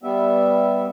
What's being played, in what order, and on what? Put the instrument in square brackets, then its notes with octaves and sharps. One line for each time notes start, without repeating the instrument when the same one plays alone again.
[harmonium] G3 B3 E5